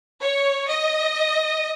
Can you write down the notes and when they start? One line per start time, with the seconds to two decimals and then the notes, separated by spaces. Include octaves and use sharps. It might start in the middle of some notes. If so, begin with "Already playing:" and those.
0.22 C#5
0.69 D#5